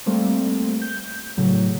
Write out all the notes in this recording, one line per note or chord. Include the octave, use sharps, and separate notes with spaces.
G3 A3 A#3 C4
G6
A2 C#3 F#3